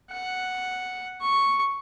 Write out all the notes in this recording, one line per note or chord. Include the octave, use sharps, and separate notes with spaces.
F#5
C#6